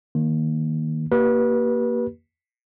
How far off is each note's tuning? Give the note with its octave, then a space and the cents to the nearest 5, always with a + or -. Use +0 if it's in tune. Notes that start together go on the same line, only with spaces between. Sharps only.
D#3 +0 A#3 +0
A#3 +0 G4 -30 B4 -30